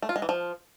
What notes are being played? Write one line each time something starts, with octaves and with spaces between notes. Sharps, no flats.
A3
F4
G#3
E3
F3